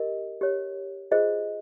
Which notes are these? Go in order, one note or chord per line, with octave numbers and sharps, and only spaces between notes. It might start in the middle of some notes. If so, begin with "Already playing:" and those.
Already playing: G4 A#4 D#5
G4 C#5
F4 G#4 C5 D#5